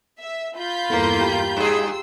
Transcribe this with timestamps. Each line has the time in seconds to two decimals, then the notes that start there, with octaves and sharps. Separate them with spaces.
0.20 E5
0.58 F4 B5 G6
0.90 E2 G2 A#3 B3 E4 A4
1.20 G4 G5 A#5
1.57 G2 G#4 C6 E6